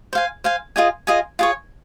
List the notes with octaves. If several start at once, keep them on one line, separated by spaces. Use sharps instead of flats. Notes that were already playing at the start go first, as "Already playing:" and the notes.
C5 F5 G#5
C5 F5 G#5
F4 G#4 D#5 G#5
F4 G#4 D#5 G#5
F4 G#4 C#5